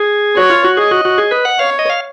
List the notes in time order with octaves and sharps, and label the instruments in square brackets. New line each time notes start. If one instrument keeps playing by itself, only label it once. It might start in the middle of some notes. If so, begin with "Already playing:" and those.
Already playing: [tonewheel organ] G#4
[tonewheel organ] F#4 [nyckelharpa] C#5
[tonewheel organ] F4
F#4
[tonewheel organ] G#4 [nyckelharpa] D#5
[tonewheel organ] F#4
F#4
G#4
B4
F#5
[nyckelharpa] C#5 [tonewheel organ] F5
[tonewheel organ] D#5
F5